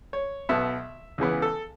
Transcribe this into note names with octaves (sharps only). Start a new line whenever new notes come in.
C#5
B1 B2 B3 E5
C#2 C#3 E3 B3
A4